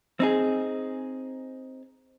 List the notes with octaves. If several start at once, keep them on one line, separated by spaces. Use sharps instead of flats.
C4 D#4 G#4